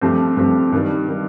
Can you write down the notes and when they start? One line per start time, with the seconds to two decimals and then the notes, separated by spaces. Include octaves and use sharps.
0.01 G2 F3 A3 C4 G4
0.37 G2 F3 A3 C4 G4
0.72 G2 D#3 G3
1.09 D#3 G3